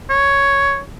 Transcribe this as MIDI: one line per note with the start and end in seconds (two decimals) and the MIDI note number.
0.10 0.80 73